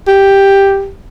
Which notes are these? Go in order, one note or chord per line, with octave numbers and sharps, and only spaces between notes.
G4